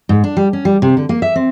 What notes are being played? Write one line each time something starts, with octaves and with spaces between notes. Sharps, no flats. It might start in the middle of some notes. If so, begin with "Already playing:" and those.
G#2
D4
G3
C#4
G3
C3
D3
A#3
E5
C4